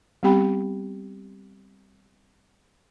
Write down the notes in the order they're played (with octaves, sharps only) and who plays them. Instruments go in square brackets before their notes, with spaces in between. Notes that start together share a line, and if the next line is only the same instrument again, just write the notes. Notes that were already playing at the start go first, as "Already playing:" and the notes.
[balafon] G3 B3 C4 G4 G5 B5